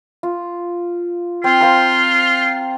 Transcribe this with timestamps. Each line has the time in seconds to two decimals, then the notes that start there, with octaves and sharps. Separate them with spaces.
0.23 F4
1.44 C4 F4
1.61 C5 F5 A#5